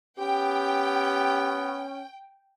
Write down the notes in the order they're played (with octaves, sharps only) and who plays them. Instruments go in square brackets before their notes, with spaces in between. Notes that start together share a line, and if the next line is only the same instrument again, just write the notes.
[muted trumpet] B3 [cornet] C#4 [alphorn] G4 [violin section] G5